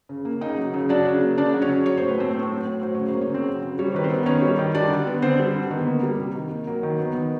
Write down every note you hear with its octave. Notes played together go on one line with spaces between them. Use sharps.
C#3
A#3
C#3 D#4 D#5
F#3
C#3
F#3 D4 D5
C#3
A#3
C#3 D4 D5
F#3
C#4 C#5
C#3
F#3 C#5
A2 C5
B4
A3 C4 C5
A2
F#3
A2
F#3 C5
C#3 C#5
C5
A#3
C#5
C#3 C4 C5
F#3
C#3
G3 C#5
C5
D#3 B4
C4 C5
B3
D#3 C#4 C#5
G3
D#3
G3 D4 D5
D3
B3
D3 C4 C5
G3
D3
D#3 B3 B4
A#3
G3
C3
D#3
A#3
F#3 A#3 A#4
D#3
B3
D#3